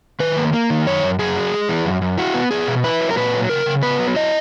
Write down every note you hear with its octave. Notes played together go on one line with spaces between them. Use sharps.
D#3 B4
A#3
A#3
D#3
F#2 C#5
F#2
F#2 G#4
F#3
G#3
E3
F#2
F#2
E4 F#4
B3
B3 G#4
B2
E4 B4
F#3
A#4
A#2 B4
F#3
C#3 A#4
C#3
B3 B4
F#3
E4 D#5